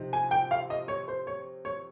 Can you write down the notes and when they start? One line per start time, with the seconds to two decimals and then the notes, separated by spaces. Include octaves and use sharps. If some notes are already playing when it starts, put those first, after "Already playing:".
Already playing: C3 F3 C4 D#4
0.13 G#5
0.31 G5
0.51 F5
0.70 D#5
0.88 C#5
1.08 C5
1.27 C#5
1.65 C#5